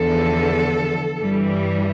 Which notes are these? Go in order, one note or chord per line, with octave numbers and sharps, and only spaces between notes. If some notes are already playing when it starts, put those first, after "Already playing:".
Already playing: E2 D3 F3 A4
G2 E3 G3